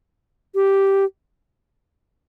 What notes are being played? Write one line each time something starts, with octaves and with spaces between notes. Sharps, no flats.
G4